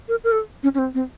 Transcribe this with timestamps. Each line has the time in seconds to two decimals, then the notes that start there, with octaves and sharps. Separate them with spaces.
0.08 A#4
0.24 A#4
0.32 A4
0.63 C#4
0.74 C#4
0.79 C4
0.94 C4